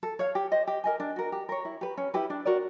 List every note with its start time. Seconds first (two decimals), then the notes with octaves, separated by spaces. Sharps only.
0.03 A4
0.19 C#5 F5
0.35 G4
0.52 C5 D#5
0.67 G4
0.84 A#4 D#5 G#5
1.00 D4
1.16 F#4 A#4
1.32 G4
1.49 A#4 C#5
1.65 E4
1.81 G4 B4
1.97 C#4
2.14 E4 G4 B4
2.30 D4
2.45 F#4 A#4 D5